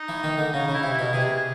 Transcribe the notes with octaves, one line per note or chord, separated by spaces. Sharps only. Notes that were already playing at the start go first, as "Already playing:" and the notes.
Already playing: D#4
E3
D#3
D3
C#3 D#4
C#3 E4
C3
E4
B2
C3 G#4
G#4